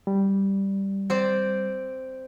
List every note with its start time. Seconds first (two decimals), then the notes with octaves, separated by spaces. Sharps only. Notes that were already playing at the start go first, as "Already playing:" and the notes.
0.07 G3
1.10 C4 C5 D5